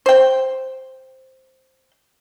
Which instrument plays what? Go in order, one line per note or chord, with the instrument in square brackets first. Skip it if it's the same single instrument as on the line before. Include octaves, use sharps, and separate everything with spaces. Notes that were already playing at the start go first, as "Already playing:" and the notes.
[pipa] C5 G5